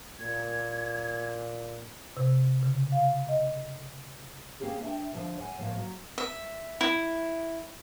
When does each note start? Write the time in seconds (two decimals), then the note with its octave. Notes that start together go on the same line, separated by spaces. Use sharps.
0.19 A#2 G#6
2.17 C3
2.63 C#3
2.92 F5
3.29 D#5
4.60 A#3 C4 C#4 G4 G#4
4.81 D4 E5 F#5 G5
5.12 D3 D#3 F3
5.37 C#5 F#5 G#5
5.58 A2 F3 A3 A#3
5.76 F#3
6.18 E5
6.81 E4